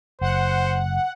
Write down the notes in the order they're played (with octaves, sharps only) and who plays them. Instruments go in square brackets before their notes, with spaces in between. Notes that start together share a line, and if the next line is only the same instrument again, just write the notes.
[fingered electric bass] F#1 [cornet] C5 [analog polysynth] F#5